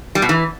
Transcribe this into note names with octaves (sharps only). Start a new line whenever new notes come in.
G3
B2
E3